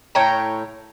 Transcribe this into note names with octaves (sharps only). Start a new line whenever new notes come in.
A2 C#5 G5 A#5